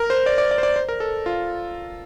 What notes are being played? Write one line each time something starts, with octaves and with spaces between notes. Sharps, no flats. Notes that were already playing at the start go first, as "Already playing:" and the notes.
Already playing: A#4
C5
D5
D5
D5
C5
D5
C5
A#4
A4
F4